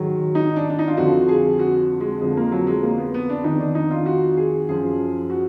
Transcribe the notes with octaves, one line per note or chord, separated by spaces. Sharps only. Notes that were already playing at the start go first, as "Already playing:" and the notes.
Already playing: G#2 D#3 F#3
D#4
D4
D4
D#4
F4
F2 D3 F3 F#4
G#4
F#4
G#3
F2 D3 F3 G#3
A#3
F#3
G#3
A#3
B3
B3
D4
F2 D#3 D#4
D4
D#4
F4
F#4
G#4
F#2 F3 G#4
F#4